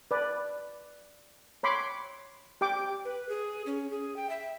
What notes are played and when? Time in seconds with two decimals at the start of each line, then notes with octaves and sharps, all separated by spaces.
0.11 B4 D5
1.63 C#5 B5 C6 D6
2.61 G4 G5 D6
3.05 B4
3.29 G#4
3.66 C#4
3.91 G#4
4.16 G5
4.30 E5